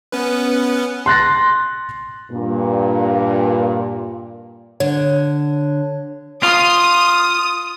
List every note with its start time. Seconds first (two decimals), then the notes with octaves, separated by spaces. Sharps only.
0.12 B3 C#4 B4
1.06 C6 F#6 A6 A#6
2.31 G2 A#2
4.80 D3 C#5
6.43 F4 D#6